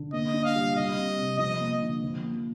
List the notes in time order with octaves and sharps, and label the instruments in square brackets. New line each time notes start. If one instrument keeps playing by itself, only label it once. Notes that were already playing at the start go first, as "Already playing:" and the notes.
Already playing: [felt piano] D3
[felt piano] A#3 [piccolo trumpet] D#5
[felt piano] D4
[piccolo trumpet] F5
[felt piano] G3
[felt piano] G3 [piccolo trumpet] D#5
[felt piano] C4
C3
[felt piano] F3 [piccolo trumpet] D#5
[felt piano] A#3
D3
F3
A#3